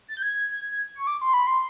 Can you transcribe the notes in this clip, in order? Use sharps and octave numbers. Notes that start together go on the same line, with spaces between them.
A6
G6
G#6
C#6
D6
C6
B5
C6